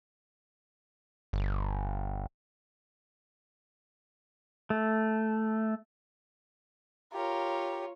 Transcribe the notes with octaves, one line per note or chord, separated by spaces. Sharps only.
G1
A3
F4 G4 A#4 C#5